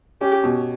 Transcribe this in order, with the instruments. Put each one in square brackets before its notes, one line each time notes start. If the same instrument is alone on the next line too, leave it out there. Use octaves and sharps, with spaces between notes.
[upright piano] C#4 [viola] G4
[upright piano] B2